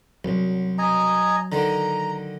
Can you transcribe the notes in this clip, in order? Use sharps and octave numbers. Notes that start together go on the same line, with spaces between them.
C2 F#3
D#5 G#5 A#5
D3 D#3 A#5